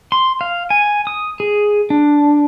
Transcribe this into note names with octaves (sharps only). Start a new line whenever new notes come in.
C6
F5
G#5
D#6
G#4
D4